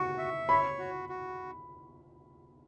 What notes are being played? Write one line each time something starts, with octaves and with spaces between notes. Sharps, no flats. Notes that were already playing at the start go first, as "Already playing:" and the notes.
Already playing: F#4 C#6
E5
C#5 B5
F#4
F#4